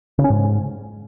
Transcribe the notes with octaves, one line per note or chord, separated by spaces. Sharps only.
C#3
C#4
G#2